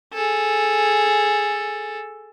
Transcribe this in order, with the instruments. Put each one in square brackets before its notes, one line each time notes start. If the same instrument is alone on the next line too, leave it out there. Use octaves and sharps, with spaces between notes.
[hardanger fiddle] G#4 A4